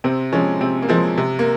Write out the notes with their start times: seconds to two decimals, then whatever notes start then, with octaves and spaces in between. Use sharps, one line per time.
0.04 C3 C4
0.32 F3 G#3 C#4
0.61 C3 C4
0.82 A#3
0.89 F3 G#3 C4
1.18 C3
1.39 A#3